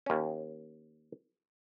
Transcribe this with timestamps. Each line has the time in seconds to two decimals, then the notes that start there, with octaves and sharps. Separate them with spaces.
0.06 D#2 C#4